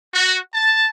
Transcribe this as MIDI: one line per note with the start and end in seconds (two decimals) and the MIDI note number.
0.13 0.38 66
0.54 0.88 81